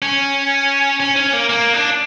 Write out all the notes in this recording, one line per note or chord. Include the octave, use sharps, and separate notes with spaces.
C#4
C#4
C#4
A#3
A#3
D4